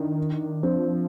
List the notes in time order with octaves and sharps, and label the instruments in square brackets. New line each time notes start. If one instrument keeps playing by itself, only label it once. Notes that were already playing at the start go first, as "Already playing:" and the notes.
Already playing: [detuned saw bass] D#3 [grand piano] D4 E4
[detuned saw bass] F3 [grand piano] C4 D4